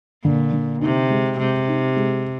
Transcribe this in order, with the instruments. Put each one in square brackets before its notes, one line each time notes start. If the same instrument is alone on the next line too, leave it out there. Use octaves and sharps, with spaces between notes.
[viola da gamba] A#2 [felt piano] D3
[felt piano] D3
[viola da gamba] C3 [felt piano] D#4
[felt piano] G#3
[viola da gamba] C3 [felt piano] G#3
[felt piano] D#4
G#3